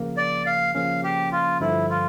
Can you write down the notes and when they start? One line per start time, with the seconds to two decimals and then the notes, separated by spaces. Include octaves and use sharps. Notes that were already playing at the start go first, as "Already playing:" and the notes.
Already playing: C#3 F3 A#3
0.17 D5
0.47 F5
0.75 C#3 F3 A#3 C#4 F5
1.03 G4
1.32 F4
1.60 G2 D3 F3 E4
1.90 F4